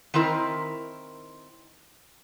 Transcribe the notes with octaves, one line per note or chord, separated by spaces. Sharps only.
D#3 C4 E4 A#4